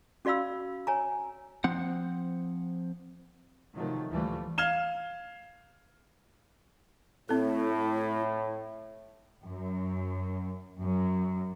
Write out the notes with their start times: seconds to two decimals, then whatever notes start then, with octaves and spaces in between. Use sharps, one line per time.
0.25 C#4 F#4 D5 F5 B5 E6
0.87 C#5 G#5 A#5
1.64 F3 C4 F#5
3.74 C3 D#3 F3 F#3 A3
4.09 D2 A#2 E3 F3 G3 A3
4.58 F5 F6 G#6 E7 G7
7.29 A2 C4 E4 A4
9.44 F#2
10.81 F#2